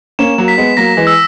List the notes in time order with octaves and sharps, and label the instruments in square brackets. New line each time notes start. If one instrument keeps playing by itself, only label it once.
[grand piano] A#3 C#4 [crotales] E7
[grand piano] F#3 A#3
[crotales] B6
[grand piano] G#3 B3
[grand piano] F#3 A#3 [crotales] A#6
[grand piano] E3 G#3
[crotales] E6